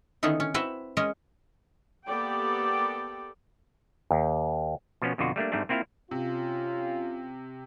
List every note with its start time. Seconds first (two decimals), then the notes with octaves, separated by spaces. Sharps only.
0.23 D3 D#3 B3 C#4 D#4 E4
0.40 C#4
0.54 C4 E4 F#4 B4 C5 E5
0.97 G#3 C#4 A#4 D#5
2.07 A#3 B3 G4 A4 D5 G5
4.11 D#2
5.02 B2 F3 B3 C#4
5.18 F2 B2 D3 F4 F#4
5.36 G3 A3 A#3 D4
5.52 G#2 G3 A3 C4 D4
5.69 A#3 C4 E4 F4 F5
6.11 C3 C#4 F4